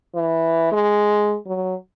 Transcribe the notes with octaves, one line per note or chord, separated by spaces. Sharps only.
E3
G#3
F#3